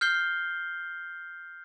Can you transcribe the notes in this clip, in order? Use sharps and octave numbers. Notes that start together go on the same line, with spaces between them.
F6 G6 C7 G7